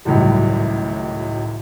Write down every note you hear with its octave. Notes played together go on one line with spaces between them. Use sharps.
G#1 C#2 F#2 A2 G3